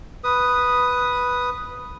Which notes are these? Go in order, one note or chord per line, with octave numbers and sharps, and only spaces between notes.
B4 D#6